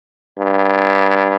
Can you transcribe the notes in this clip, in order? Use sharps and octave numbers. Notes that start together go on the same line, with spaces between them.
G2